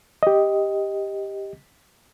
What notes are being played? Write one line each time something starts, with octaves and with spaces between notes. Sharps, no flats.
G4 D#5